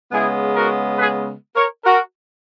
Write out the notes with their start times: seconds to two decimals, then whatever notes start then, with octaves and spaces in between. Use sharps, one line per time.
0.12 C#3 G#3 B3 E4 G#4
0.55 F#4 A#4
0.99 G#4 B4
1.56 A#4 C#5
1.84 F#4 A#4